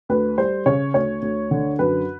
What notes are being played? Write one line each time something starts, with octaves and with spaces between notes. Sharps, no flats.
D2 B4
G3 C5
C#3 C#5
D2 C#5
D2
D3
F#2 B4